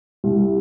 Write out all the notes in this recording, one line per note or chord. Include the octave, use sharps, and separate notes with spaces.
C2